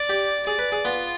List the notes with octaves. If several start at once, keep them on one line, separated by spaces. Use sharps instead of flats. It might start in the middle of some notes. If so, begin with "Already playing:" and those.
Already playing: D5
G4
G#4 D5
B4
G#4
B3 F4